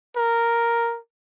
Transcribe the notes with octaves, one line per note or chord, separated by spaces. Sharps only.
A#4